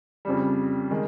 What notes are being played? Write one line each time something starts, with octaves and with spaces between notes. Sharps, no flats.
F2 C#3 G3
D#3 G#3